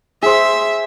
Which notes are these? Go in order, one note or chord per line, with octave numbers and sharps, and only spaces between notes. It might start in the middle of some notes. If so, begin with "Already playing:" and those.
G#4 C5 E5